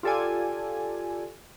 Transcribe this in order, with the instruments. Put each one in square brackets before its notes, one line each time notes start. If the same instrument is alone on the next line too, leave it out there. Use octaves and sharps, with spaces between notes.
[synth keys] F4 G4 A4 D5 G#5